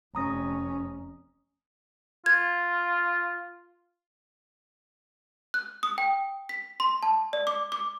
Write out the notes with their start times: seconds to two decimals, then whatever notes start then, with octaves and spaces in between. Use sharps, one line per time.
0.15 F1 C#4 A#5 D#6 A#6
2.26 F4 G#6
5.54 F#6
5.83 D#6
5.98 G5
6.49 B6
6.80 C6
7.03 A5
7.33 D5
7.47 D6
7.72 D6